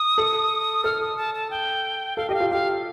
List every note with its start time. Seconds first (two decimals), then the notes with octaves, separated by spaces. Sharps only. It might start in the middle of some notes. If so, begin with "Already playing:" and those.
Already playing: D#6
0.18 A4
0.84 A4 F6
1.01 D#6
1.17 A5
1.34 A5
1.50 G5
2.17 A4 F5
2.29 G4 D#5
2.34 F5
2.40 F4
2.50 G4 F5